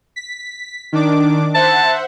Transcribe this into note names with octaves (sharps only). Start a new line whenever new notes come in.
B6
D#3 D4 D6
C5 E5 F#5 A5